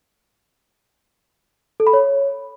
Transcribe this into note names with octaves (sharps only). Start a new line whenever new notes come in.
A4
B5
C#5